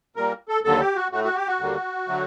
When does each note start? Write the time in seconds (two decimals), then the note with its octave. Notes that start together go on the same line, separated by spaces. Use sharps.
0.16 A#2 G3 A#3 A#4
0.48 A4
0.64 D#2 D3 F#3 A4
0.80 G4
0.96 F#4
1.12 A2 A3 F#4
1.24 F#4
1.36 G4
1.48 F#4
1.59 D#2 D3 G3 A#3
2.08 D3 F#3 A3